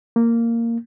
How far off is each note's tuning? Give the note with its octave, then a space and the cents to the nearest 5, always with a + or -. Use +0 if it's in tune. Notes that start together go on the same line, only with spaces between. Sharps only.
A#3 -10